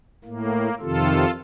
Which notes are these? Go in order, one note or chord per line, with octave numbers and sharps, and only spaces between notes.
A2 A#3
F2 C3 D#3 F4 A4